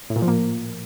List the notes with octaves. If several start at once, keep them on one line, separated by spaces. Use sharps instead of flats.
A2
A#2
F3
A#3